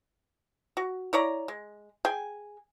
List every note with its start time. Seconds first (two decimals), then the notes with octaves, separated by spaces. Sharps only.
0.77 F#4
1.13 E4 C#5 D5 A#5
1.48 G#3
2.05 G#4 G5 G#5